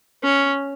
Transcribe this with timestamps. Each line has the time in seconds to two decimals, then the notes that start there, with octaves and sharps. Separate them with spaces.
0.23 C#4